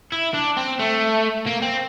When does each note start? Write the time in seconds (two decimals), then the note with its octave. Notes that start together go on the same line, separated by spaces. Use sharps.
0.12 E4
0.34 D4
0.57 C4
0.79 A3
1.46 A#3
1.62 C4